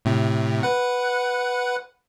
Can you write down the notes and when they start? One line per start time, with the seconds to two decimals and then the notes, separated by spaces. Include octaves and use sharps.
0.05 A2 C3
0.63 B4 F#5